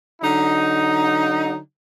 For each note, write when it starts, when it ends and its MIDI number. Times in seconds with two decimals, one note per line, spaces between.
0.22 1.56 50
0.22 1.56 54
0.22 1.56 63